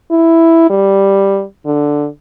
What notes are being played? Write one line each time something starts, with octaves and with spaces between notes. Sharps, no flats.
E4
G3
D3